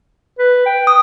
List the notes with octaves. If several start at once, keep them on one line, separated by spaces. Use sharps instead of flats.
B4
G5
D#6